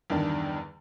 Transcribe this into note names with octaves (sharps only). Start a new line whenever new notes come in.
E2 G2 D3 D#3 D4